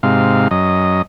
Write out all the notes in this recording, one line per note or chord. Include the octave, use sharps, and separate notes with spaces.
G#2 C3 F5
F#2 D#5